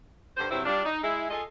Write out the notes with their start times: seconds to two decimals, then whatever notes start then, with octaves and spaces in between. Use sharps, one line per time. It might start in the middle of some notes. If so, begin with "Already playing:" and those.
0.37 G2 D3 D4 C5
0.50 G2 C3 F#3 C4 E4 C5
0.65 G3 D4 F4
0.85 D#4
1.03 G#3 E4
1.30 F4 G#4 A4 D#5